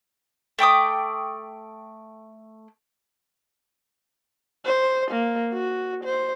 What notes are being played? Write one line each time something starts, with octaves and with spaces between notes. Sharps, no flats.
A3 G5 D6 D#6
C5
A#3
F#4
C5